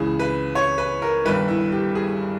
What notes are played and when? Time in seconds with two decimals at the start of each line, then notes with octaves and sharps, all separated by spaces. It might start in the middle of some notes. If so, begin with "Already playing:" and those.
Already playing: C#2 C#3 E3 G#4
0.19 B4
0.55 C#5
0.78 B4
1.02 A#4
1.25 G1 G2 D#3 B4
1.48 E4
1.72 G4
1.95 G#4